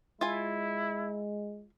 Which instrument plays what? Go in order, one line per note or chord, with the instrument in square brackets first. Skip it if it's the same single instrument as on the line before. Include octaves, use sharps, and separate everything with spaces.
[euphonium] G#3 [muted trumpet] E4 [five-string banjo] F4 G#5